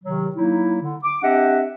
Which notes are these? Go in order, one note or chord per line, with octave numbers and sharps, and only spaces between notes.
C3 D#3 F#3
F#3 A#3 D#4 E4
D3
D6
C4 D4 G4 D#5 E5 F#5